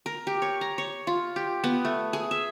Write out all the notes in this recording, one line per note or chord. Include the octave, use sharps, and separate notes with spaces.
A#4
G4
C#5
A#5
C#5
F4
G4
B3
A3
G#4
E5